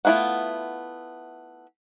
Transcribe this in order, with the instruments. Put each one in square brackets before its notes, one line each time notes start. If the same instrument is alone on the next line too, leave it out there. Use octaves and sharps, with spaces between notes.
[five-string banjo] A3 B3 E4 F4 F#5